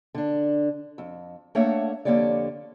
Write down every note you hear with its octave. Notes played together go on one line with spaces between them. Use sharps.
D3 D4
F2
A3 A#3 D4 C#5 E5 F#5
F2 D3 A#3 G4 C#5 D5